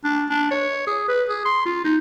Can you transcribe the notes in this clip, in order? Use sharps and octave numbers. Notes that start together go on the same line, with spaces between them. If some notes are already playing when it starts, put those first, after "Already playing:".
D4
D4
C#5
G#4
B4
G#4
C6
F4
D#4